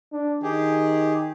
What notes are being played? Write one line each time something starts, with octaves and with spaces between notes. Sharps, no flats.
D4
D#3 G4 G#4